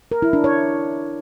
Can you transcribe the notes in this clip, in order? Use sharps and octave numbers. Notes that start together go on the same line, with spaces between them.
A#4
E4
D4
C#5